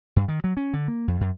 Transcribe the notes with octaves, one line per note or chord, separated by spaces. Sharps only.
G2
D#3
F#3
C#4
D3
A#3
F2
F#2